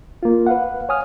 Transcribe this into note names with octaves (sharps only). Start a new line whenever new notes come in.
A#3 F4
B4 F5 F#5
C#5 G#5 D#6 F6